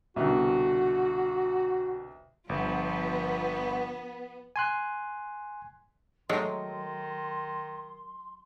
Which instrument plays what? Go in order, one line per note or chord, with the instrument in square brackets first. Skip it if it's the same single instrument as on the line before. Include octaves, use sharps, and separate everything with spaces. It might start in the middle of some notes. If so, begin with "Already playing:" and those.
[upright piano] C2 B2 D3 [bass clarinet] F#4
[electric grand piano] G1 [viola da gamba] F3 [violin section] B3
[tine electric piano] G#5 C6 F#6
[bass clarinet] D#3 [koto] F#3 [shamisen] G#3 A3 D#4 [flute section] C6